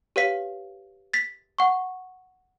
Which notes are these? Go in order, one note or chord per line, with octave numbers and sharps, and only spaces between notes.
G4 B4 C#5 F5 B6
A6 B6
F#5 C#6